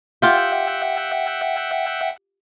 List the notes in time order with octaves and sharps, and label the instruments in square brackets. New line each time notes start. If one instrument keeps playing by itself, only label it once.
[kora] F4 G4 [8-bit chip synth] E5 F#5 G5